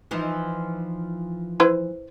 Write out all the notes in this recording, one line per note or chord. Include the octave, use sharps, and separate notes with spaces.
E3 F3 D#4
E4 B4 C5